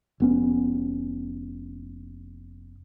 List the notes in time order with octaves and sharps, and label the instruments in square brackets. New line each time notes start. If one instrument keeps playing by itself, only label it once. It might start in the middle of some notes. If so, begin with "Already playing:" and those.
[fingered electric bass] F1 B3 C#4